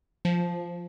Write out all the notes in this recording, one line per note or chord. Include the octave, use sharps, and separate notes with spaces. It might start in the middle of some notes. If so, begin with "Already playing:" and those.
F3